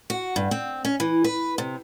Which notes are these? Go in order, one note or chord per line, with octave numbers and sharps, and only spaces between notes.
F#4
G2
C4
C#4
E3
B4
C3